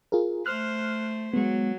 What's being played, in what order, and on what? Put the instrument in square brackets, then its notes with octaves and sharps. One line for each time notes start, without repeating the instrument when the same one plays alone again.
[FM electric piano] F4 G#4 A#4
[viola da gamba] A3 C5 [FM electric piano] F6 F#6
[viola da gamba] F#3 [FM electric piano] G#3 B3